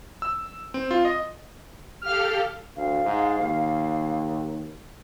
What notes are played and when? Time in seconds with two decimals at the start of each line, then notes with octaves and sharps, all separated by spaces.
0.22 E6
0.74 C4
0.91 F4
1.05 D#5
2.02 G4 A4 F5 F6
2.76 D2 F5
3.05 G#2
3.39 D#2